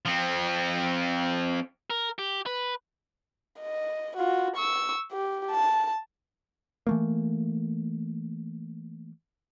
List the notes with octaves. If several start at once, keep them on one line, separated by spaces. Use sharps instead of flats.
F3 C4
A#4
G4
B4
D#5
F4 F#4
C#6 E6
G4
A5
E3 A3 A#3